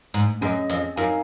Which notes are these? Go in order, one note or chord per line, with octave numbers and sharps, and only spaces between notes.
G#2
F#2 C#4 G#4 D#5
F2
F#2 D#4 A#4 F5 G#5